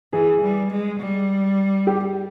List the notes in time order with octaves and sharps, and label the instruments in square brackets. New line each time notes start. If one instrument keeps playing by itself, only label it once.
[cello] E3 [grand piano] G#4
[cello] G3
G#3
G3
[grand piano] G4